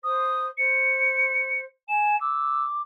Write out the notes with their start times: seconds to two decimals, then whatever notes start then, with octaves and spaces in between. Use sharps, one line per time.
0.04 C5 D#6
0.58 C5 C#7
1.89 G#5 E7
2.21 D6 E6